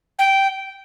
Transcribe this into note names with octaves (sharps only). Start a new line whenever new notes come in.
G5